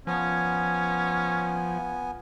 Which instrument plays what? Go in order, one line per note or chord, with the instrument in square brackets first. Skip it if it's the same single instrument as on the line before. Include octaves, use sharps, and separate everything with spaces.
[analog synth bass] F3 [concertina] B3 G#5 [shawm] C#4